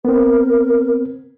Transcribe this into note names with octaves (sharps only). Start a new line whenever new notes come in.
B3 C4 A#4